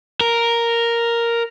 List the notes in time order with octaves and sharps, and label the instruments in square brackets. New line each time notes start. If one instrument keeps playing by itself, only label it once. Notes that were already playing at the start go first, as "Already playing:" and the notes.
[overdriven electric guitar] A#4